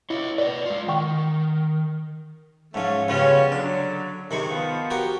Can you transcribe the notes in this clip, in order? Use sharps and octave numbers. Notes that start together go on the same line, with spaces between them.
E4 C#5 D#5
B4 D5 D#5
G#3 F4
D#3 F#5 G5 C#6
G#2 F3 A3 C#4
C#3 G3 B3 C#4 F4
D3 F#3 D5
C3 D#3 G#3 B5 C#6
F3 B3
F#4 G4 A#4